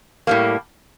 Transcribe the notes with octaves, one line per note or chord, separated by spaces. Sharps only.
A2 G3 A#3